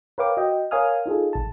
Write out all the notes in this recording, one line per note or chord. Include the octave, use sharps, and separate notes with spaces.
A#4 B4 C#5 F5 G5 D6
F#4 D#5 G5
A#4 C#5 F5 G#5 D#6 F6
D#4 F4 G#4 A4
A1 A5